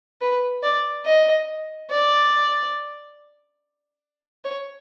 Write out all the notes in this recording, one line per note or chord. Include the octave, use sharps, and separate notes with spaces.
B4
D5
D#5
D5
C#5